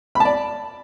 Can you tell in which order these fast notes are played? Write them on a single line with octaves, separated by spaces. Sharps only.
B5 A5 D5